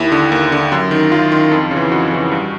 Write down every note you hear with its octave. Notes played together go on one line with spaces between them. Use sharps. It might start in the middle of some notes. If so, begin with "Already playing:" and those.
Already playing: D#2 E4
D3
D#2
D3
F#2
D#3
F#2 F4
D#3
F2
C#3 E3
F2 F#4
C#3 E3
G2